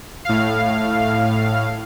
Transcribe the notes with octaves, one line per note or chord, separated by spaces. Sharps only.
A2 F5